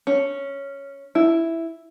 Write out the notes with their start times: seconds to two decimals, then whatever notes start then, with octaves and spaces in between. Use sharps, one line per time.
0.07 C#4
1.15 E4